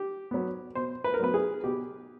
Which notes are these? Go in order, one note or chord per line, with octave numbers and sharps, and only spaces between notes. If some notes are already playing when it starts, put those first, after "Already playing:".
Already playing: G4
F#3 B3
B2 C5
B4
A#4
F#3 B3 B4
G#4
B2 G4